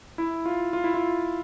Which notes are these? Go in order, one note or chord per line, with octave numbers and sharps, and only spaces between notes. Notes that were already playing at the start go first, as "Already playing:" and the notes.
E4
F4
F4
E4
F4